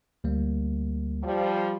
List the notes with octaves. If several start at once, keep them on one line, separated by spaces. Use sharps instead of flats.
D2 G3 A#3
F3 G3